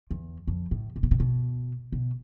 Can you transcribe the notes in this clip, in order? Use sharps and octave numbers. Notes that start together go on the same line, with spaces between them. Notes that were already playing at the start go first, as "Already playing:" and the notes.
E2
F2
A2
C3
B2
C3
B2
B2